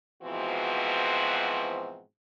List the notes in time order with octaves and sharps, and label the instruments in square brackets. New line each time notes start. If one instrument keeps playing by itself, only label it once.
[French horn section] G#2 B2 E3 F3 C4 F#4